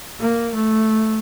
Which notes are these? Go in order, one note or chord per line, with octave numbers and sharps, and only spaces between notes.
A#3
A3